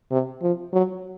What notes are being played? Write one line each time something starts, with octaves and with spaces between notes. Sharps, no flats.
C3
F3
F#3